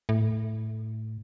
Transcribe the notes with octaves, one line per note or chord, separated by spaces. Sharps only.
A2